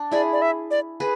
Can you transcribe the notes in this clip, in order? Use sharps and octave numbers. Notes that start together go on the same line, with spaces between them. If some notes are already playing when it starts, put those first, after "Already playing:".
Already playing: D4
E4 G#4 D5
D5
E5
D5
G#4 B4